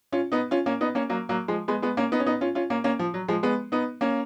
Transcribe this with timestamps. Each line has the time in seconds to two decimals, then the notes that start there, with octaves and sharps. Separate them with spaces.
0.12 C#4 F4
0.32 B3 D#4
0.51 C#4 F4
0.66 A#3 C#4
0.81 B3 D#4
0.95 A#3 C#4
1.09 F#3 A#3
1.29 F#3 A#3
1.48 F3 G#3
1.68 G#3 B3
1.82 G#3 B3
1.97 A#3 C#4
2.12 B3 D#4
2.20 C#4
2.26 B3 D#4
2.41 C#4 F4
2.55 C#4 F4
2.70 A#3 C#4
2.84 A#3 C#4
2.99 F3
3.14 F#3
3.28 F3 G#3
3.43 G#3 B3
3.72 B3 D#4
4.01 A#3 C#4